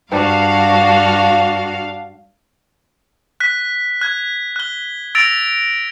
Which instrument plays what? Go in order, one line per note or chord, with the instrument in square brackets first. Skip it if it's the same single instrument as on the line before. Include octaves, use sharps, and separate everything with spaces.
[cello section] G2 F#4 [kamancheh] D4 [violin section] F5
[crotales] F#6 B6
F#6 G#6
F#6 G7
E6 A6 A#6 D7 F7